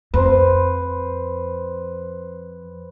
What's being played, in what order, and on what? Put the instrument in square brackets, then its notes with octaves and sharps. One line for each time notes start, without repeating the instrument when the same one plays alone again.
[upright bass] F2 [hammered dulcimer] B4 C5